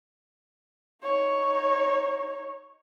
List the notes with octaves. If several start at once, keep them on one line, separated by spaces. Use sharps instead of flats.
D#4 C#5